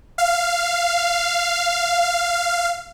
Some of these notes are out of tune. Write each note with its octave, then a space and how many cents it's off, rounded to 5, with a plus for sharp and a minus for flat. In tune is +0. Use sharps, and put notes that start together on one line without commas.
F5 -10